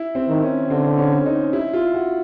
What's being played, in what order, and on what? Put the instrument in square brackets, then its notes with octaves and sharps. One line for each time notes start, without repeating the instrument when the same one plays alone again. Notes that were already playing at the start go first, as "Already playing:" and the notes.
Already playing: [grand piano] E4
C4
[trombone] D#3
[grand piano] C#4
[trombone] D3 [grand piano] C4
[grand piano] C#4
D#4
E4
F4
F#4